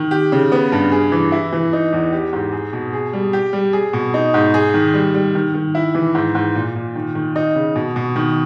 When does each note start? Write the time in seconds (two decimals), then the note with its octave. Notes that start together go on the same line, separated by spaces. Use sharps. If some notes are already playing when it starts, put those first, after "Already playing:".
Already playing: D#3
0.11 G4
0.32 C#3
0.52 B3
0.72 G2
0.92 G#4
1.12 E3
1.32 E4
1.53 E3
1.73 D#4
1.93 E2
2.13 G4
2.33 G#2
2.52 G#4
2.73 B2
2.93 G#4
3.13 G3
3.33 G4
3.53 G3
3.73 G#4
3.93 B2
4.14 D#4
4.34 G#2
4.54 G#4
4.74 D#3
4.94 G3
5.14 G3
5.35 D#3
5.54 D#3
5.75 E4
5.95 E3
6.15 G#2
6.35 G#2
6.55 A#2
6.75 A#2
6.95 D#3
7.15 D#3
7.36 D#4
7.56 C#3
7.76 B2
7.96 B2
8.16 D#3